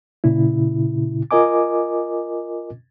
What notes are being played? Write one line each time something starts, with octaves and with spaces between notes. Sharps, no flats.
A#2 C#3 E4
F4 A#4 D#5 G#5 D6